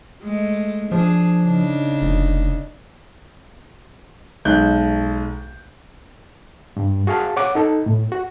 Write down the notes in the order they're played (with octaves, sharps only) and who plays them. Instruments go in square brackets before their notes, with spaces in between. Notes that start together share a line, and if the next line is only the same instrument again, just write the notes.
[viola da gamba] G#3 A3
[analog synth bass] F3 [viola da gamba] D4 G#4
[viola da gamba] C#3 D4 D#4
[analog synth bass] F1
[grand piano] B1 G#3 F#6 G6
[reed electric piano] G2
F#4 G#4 F5 A5
C#5 F#5 D6
D#4 A4
A2
F#4